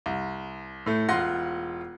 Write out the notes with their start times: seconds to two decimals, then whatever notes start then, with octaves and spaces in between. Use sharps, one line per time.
0.06 C2
0.86 A2 A3
1.09 E1 F4 F#5 C6 A#6